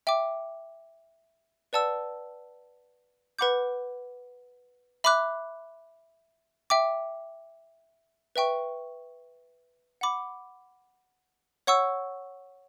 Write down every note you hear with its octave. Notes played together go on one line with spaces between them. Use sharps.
E5 G5 D6
B4 D5 F#5 A5 E6
B4 F#5 B5 D6 G6
E5 B5 D6 F#6
E5 G5 D6
B4 E5 G5 C#6
F#5 B5 D6
C#5 F#5 C#6 E6